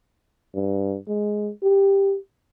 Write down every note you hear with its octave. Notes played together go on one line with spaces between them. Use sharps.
G2
G#3
G4